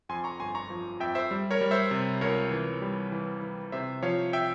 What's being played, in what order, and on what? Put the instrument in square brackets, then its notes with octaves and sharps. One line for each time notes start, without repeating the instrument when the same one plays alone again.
[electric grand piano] F2 G#5 C6
A#5 C#6
G1 G#5 C6
A#5 C#6
F3
F2 E5 G5
C5 E5
G3
A#4 C#5
G3
C5 E5
C3
C#2 A#4 C#5
E3
G3
E3
E3
C3 C5 E5
F3 C#5 F5
E5 G5